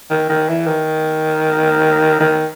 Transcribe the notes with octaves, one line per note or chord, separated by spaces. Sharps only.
D#3
D#3
E3
D#3
D#3